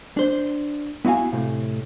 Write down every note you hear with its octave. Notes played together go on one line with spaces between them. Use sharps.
D4 C5
B3 E4 F#4 F5 G#5
A2 C3